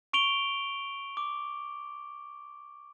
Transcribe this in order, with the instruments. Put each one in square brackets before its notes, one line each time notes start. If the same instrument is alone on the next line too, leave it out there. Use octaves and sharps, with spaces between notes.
[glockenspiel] C#6 D7 F7 G7
D6